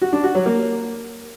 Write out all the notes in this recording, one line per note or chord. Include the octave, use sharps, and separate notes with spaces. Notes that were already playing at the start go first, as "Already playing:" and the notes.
F#4
D4
F#4
F#3
A#3